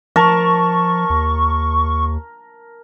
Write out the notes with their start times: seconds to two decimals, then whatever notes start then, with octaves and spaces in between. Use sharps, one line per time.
0.16 F3 A#4 A5 C#6
1.10 D#2